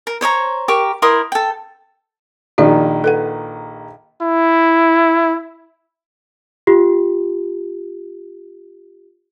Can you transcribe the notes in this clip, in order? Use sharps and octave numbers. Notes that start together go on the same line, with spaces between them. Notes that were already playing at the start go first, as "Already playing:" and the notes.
A#4
C5 C#5 D#5 A#5
G4 A#4 C#6
E4 A#4 C6 D#6
A4 G5
A#1 D#3 F#4 D5
A4 B4 F#5
E4
F4 G4